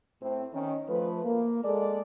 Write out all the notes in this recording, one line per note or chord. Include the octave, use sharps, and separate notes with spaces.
A2 C4
D#3 C#4
F3 A3 B4
A#3
G#3 A4 D5